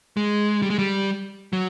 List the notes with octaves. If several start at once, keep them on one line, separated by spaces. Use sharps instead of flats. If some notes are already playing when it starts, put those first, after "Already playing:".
G#3
G3
G#3
G3
F#3